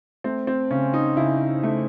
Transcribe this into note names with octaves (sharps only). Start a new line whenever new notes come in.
A3 C4
C4
C#3 C#4
D#4
C#3 E4
A3